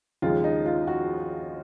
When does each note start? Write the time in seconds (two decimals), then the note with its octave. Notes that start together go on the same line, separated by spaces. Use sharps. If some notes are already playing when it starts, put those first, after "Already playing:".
0.22 D#2 C#3 F3 G#3 F4
0.44 D#4
0.66 F4
0.87 F#4